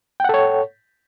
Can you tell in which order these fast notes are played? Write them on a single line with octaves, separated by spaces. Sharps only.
G5 F#5 A4 C#5